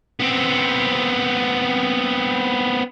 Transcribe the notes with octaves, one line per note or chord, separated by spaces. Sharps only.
B3 C4